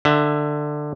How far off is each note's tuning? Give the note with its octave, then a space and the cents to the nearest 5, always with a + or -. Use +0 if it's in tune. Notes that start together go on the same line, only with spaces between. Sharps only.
D3 +15 E5 +15